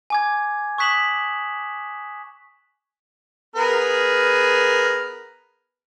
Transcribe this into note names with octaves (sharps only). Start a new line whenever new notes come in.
G#5 D6 G#6
C#6 D#6 F#6 B6 E7 F#7
B3 G#4 A#4